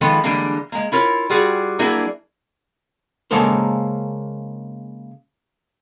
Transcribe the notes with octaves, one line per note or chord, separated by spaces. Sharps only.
D#3 F3 G#3 B3 F4 A4
D3 E3 G3 G#3 A#3
G#3 A#3
E4 F4 A#4 C#5
G3 F4 F#4 G#4
F#3 A#3 D4 E4 G#4
C#3 G#3 A#3 A4 A#4 C5